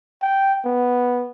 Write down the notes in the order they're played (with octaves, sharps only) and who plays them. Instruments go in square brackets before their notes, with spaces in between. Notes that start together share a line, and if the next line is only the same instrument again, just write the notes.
[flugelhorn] G5
B3